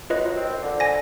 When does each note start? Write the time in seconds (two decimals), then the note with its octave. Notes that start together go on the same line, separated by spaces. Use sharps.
0.10 F#2 F4 B4 D#5
0.36 C4
0.62 D3
0.80 G#5 A#6